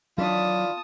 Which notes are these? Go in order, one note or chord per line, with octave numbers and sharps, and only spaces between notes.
D#3 E3 F#3 D4 F4 A5 D#6